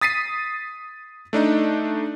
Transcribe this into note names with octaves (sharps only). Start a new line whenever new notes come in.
D#6 A6 B6 C7 D#7
A3 D4 D#4